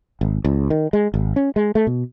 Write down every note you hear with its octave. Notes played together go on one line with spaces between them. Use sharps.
G#1
C#2
D#3
G#3
G#1
C#4
G#3
A3
B2